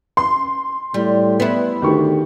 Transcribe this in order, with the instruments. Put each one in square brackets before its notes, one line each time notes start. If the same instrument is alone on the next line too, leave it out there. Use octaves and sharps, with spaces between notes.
[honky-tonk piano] C6
[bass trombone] A2 [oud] G3
[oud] B3 E4
[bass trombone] D2 [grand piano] D#3 G4 C#6